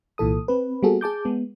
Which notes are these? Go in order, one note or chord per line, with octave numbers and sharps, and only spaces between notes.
C2 A#2 E3 A4 D#6
C4 B4
G3 A#3 B3 F#4 G#4 A4
G#4 A5 D6 G6
G#3 B3